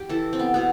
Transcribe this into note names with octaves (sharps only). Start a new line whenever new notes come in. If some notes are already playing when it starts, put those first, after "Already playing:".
Already playing: G4
E3 A4
C4
B3
B2 B3